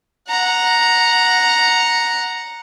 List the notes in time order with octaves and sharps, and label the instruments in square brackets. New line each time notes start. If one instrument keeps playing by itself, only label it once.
[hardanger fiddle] F#5 A#5